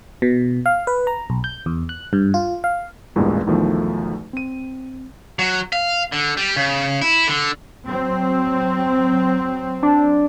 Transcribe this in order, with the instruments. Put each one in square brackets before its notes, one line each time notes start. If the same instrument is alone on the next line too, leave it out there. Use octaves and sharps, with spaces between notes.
[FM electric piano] B2
F5
B4
A#5
B1
G6
E2
F#6
G2
F4
F5
[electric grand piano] A1 E2 G2 A#2 G#3
B1 E2 D#3 F3 A3
C4 D#7
[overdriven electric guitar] F#3
F5
D3
G3
C#3
E4
D3
[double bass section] F#3 C4
[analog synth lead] D4